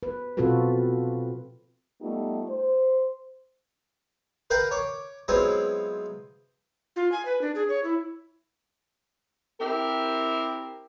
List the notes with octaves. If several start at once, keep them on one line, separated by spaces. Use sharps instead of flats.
B4
B2 C4 F4 F#4 A4 B4
G3 A3 B3 D#4 F4 G4
C5
A#4 B4 F5 G5 A#5
C#5 D6
F#3 G#3 B3 C4 E4 F4
F4
G#5
B4
D4
G#4
C#5
E4
C4 E4 G4 A#4